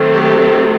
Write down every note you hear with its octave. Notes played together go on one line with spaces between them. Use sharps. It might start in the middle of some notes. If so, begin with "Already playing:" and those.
Already playing: D#3 F#3 A3 C4
G4